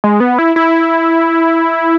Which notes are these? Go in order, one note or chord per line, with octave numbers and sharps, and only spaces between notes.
G#3
B3
E4
E4